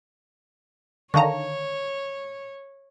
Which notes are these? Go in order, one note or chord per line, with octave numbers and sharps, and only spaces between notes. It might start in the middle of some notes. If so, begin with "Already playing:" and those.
D3 D#3 C#5 F5 A5 A#5 C#6